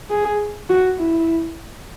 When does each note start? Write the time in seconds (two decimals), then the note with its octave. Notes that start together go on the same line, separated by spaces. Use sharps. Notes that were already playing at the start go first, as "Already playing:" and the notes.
0.10 G#4
0.69 F#4
0.99 E4